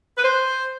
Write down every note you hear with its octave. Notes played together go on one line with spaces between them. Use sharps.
B4
C5